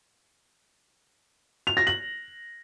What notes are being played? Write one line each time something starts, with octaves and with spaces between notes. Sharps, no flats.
F7
A#6
F#7